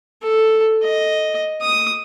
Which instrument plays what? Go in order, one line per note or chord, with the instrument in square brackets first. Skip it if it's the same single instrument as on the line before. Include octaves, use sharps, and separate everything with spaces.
[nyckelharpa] A4
D#5
D#6